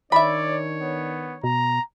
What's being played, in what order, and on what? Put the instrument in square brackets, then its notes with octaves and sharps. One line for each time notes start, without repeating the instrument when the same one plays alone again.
[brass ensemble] D#3 D4 C#5 [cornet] D5 [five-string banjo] E5 B5
[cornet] B3
[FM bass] B2 [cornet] A#5